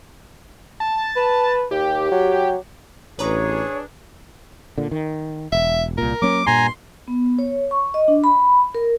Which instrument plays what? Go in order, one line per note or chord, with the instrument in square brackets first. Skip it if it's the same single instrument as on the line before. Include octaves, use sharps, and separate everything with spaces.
[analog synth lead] A5
[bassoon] B4
[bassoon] D#2 [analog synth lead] G4
[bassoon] F#3
[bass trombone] A1 [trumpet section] D4 G#4 [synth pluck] B4 A#5 [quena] C#5
[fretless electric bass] A#2 D3
D#3
[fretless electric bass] E1 [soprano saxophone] E5
[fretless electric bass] C2 A#2 [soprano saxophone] A#4
[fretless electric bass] F#3 A#3 C#4 [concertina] D6
[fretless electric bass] G2 A#2 [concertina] G#5 A#5 [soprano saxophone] C6
[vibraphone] B3
C#5
C#6
D#5
D4
B5
A#4